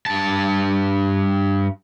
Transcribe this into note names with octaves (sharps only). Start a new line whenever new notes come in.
G2 A5